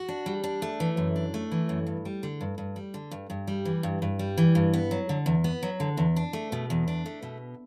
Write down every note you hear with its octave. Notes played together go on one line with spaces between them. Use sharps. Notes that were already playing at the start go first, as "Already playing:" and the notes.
Already playing: F#4
D4
G3
D4
A3
E3
F#2
D4
A3
E3
F#2
G2
G3
D3
G2
G2
G3
D3
G2
G2
G3
E3
G2
G2
G3
E3
G2
B3
F#3
D3
E2
B3
F#3
D3
E2
D4
A3
B2
E2
D4
A3
B2